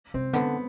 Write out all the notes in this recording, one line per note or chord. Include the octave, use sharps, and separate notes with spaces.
C3 C4
D3 B3